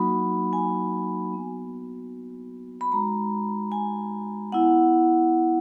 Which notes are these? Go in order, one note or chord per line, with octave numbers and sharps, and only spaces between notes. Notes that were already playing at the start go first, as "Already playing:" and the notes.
Already playing: F#3 A#3 D#4 F#4 B5
G#5
B3 F#4
B5
G#3 D#4 F#4 A#5
G#5
B3 E4 F#5